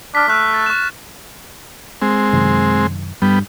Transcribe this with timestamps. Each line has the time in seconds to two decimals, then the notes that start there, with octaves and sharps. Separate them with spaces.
0.15 D4 F6 B6
0.29 A3 F6 F#6
0.54 A6
0.66 C#6 E7
2.02 G#3 C4
2.33 F#2 C3 D#3
3.22 G2 G3 B3